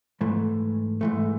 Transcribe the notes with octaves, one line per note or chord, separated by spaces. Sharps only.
G#2 E3 A3
G#2 E3 A3